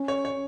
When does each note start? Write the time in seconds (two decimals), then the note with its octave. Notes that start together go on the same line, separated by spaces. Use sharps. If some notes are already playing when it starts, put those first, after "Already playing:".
Already playing: C#4
0.08 C#5
0.25 C#5